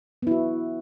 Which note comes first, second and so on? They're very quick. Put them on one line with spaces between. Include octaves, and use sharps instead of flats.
B3 E4 F#4